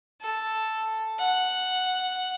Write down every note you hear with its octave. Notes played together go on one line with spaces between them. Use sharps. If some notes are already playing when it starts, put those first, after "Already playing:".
A4
F#5